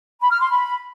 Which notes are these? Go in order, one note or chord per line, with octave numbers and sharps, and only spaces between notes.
B5
F6
C6
B5